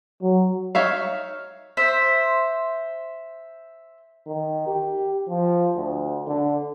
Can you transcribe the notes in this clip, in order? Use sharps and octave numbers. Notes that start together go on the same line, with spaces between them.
F#3
D#4 C#5 E5 F5
C5 E5
D#3
G4
F3
D2
D3